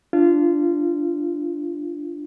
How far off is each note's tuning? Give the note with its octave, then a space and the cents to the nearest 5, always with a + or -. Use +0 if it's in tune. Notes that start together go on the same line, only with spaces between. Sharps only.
D4 +0 F4 -20